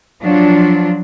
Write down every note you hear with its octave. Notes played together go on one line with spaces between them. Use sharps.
F3 F#3 D4 F4